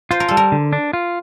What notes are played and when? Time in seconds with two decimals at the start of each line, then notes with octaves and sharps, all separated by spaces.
0.11 F4 C5
0.20 A#4
0.28 G3 A4
0.37 A#4
0.52 D3
0.73 D4
0.93 F4